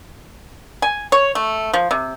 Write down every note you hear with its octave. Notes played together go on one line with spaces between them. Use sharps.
G#5
C#5
A3
F3
C3